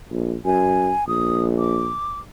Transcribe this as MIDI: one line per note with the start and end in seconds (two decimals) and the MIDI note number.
0.12 0.36 34
0.45 0.92 42
0.45 1.07 80
1.08 1.91 34
1.08 1.44 87
1.58 2.19 86